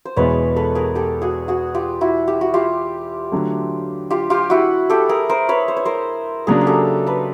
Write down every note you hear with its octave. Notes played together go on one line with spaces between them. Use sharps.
C5
E2 B2 G#3 B3 E4 B4 C#5
A4 B4
G#4 A#4
G4 A4
F#4 G#4
F#4 G#4
F4 G4
E4 F#4
G4
F#4
F4 G4
D3 F#3 A3
F4 G4
F4 G4
E4 F#4
G4 A4
G#4 A#4
A#4 C5
B4 C#5
C5
C#5
A#4 C5
C#3 F#3 A#3 D4 G#4 A#4
G#4
G4 A4
A4 B4